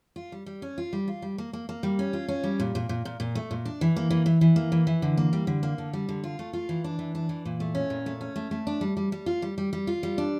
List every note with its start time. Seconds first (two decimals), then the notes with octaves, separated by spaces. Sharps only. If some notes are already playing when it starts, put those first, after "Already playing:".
0.16 F4
0.32 G3
0.46 G3
0.62 C#4
0.78 F4
0.93 G3
1.08 F4
1.22 G3
1.38 A#3
1.53 A#3
1.69 A#3
1.83 G3
1.99 C#4
2.13 F4
2.28 C#4
2.43 G3
2.60 A#2
2.75 A#2
2.89 A#2
3.05 A#2
3.20 A#2
3.35 A3
3.51 A#2
3.65 D4
3.81 E3
3.96 A#3
4.11 E3
4.26 E3
4.41 E3
4.56 A#3
4.72 E3
4.87 E3
5.02 D3
5.17 A#3
5.33 G3
5.47 D3
5.63 A#3
5.78 D3
5.93 G3
6.09 D3
6.24 F4
6.39 A3
6.53 F4
6.69 E3
6.84 D4
6.99 E3
7.15 D4
7.29 E3
7.45 A#2
7.60 A3
7.75 C#4
7.90 A#2
8.06 A3
8.21 C#4
8.36 A3
8.51 A3
8.67 D4
8.81 G3
8.97 G3
9.12 G3
9.26 F4
9.42 G3
9.58 G3
9.73 G3
9.87 F4
10.03 G3
10.18 D4